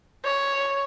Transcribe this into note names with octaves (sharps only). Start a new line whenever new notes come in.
C#5